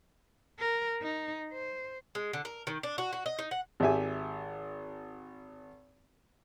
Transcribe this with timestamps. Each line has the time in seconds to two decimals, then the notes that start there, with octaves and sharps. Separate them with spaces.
0.60 A#4
1.02 D#4
1.53 C5
2.15 G#3
2.33 D3
2.45 A#4
2.67 D#3
2.83 D4
2.98 F#4
3.13 F#4
3.26 D#5
3.39 D#4
3.51 F#5
3.80 G#1 G4 E5 G#5